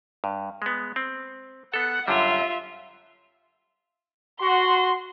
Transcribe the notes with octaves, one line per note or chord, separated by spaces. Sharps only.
G2
G#3 B3
C4
B3 A4 F#5
F#2 D3 G3 F4 E5
F#4 C6